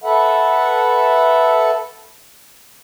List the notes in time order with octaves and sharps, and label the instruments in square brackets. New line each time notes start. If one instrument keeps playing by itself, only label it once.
[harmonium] A4 B4 E5 F#5